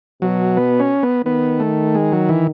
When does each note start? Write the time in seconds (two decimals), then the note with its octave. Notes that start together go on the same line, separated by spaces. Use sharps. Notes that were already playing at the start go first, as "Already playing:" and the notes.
0.22 B2 F#3
0.57 B3
0.80 C#4
1.03 B3
1.26 D#3 B3
1.60 A3
1.95 G#3
2.13 F#3
2.29 E3